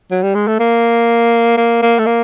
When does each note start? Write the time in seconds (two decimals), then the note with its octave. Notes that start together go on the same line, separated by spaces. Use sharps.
0.11 F#3
0.23 G3
0.35 G#3
0.48 A3
0.60 A#3
1.58 A#3
1.82 A#3
1.99 A3
2.06 A#3